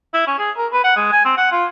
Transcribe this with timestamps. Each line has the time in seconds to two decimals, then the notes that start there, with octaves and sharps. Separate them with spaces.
0.14 E4
0.27 C#4
0.39 G#4
0.57 A#4
0.72 B4
0.84 F#5
0.96 G#3
1.12 G#5
1.25 C4
1.37 F#5
1.52 F4